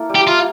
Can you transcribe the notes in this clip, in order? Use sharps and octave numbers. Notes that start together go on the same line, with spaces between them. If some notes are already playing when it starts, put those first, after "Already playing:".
Already playing: A#3 E4 A4
G3
G4
E4 F4